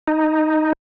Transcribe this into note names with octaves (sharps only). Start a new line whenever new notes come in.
D#4